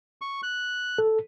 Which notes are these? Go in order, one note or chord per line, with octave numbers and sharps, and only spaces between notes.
C#6
F#6
A4